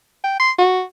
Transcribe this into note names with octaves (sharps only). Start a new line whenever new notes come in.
G5
C6
F#4